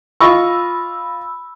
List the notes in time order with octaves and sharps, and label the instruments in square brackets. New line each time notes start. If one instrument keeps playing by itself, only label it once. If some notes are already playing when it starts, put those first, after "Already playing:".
[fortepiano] F4 D#5 C#6 [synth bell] B5 E6